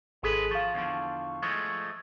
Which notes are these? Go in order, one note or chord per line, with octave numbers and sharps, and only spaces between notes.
G#1 G#3 G#4 A4 B4
F3 F5 C#6
E2 D3 F3
F3 G#3 A3 C#6